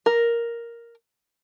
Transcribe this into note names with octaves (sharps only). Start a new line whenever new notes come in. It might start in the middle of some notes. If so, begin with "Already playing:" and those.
A#4